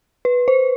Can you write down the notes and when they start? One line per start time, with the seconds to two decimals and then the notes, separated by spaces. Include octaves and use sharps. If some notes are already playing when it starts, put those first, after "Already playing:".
0.25 B4
0.48 C5